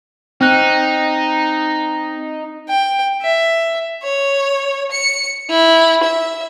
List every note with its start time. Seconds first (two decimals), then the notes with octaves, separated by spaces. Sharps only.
0.41 C4 D#4 F#6
2.69 G5
3.22 E5
4.03 C#5
4.92 C#7
5.50 E4
6.04 E5